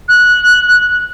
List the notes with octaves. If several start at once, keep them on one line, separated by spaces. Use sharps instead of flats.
F#6